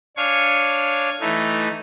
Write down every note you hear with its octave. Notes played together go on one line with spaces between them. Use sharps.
D4 C#5 F5 G#5 C#6
E3 A3 D#4